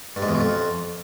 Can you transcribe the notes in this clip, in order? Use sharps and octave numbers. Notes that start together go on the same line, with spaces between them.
G2
G#2
E2
B2
F2